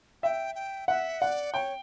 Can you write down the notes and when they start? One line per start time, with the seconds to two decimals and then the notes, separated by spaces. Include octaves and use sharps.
0.23 E5 G5
0.55 G5
0.88 E5 F#5
1.21 D5 F#5
1.54 C#5 G5